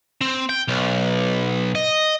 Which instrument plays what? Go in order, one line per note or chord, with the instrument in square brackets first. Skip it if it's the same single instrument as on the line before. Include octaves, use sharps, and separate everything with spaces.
[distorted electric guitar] C4
G5
B1
D#5